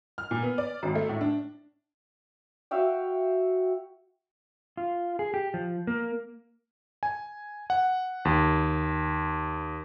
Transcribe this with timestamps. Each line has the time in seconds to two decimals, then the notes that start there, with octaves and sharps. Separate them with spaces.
0.18 F6
0.31 A#2
0.42 B3
0.58 D5
0.83 G#1
0.95 A3
1.09 A2
1.21 D4
2.71 F#4 E5 F5 G5
4.77 F4
5.19 G#4
5.34 G4
5.54 F3
5.87 A#3
7.03 G#5
7.70 F#5
8.25 D#2